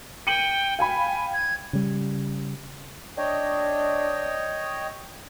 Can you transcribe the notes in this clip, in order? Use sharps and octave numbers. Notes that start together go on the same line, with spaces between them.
G5 C#7 D#7 F#7
F5 G5 G#5 B5
G#6
C#3 G3
D4 C#5 D#5 G5